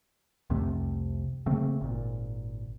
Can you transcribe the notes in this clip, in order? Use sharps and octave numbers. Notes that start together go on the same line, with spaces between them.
C2 F2 C3 A3
C#3 A3 A#3 C4
G#1 A#2